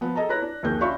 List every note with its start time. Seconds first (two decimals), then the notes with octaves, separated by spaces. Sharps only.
0.01 F3 B3
0.15 G#4 A4 D#5 A5 A#5
0.29 E4 B4 C#5 A#5 F#6 A#6
0.42 D4
0.63 A#1 D#2 A#3 G#4 G6
0.80 C#4 D4 F4 E5 B5 C#6